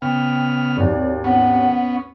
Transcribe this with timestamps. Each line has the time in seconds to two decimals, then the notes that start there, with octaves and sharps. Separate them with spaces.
0.02 C#3 B3 G5 F6
0.77 G#1 D#2 D5
1.24 B3 C#4 F#5